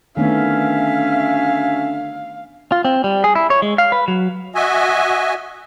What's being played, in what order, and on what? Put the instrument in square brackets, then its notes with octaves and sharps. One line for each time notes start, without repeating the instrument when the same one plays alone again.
[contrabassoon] D3 [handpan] D#3 A3 B3 [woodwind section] F#3 C#4 E5 [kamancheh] F5
[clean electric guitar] F4
C4
G3
G#4
E4
C#5
G#3
F5
B4
F#3
[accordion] F#4 D#5 E5 G#5